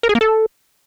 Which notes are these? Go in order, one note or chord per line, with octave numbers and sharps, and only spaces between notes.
A#4
G#4
A#3
A4